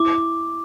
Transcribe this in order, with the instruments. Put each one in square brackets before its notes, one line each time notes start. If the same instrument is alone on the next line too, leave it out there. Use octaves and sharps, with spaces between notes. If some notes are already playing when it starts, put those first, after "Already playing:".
Already playing: [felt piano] E4 [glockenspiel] D6